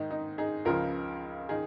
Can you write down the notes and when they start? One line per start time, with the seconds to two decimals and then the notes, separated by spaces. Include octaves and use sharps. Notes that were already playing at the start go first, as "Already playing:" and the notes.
Already playing: G#2 D#3 D#4
0.11 D#4
0.38 D#4 G#4
0.65 C#2 C#3 F3 F4 A#4
1.49 D#3 D#4 G#4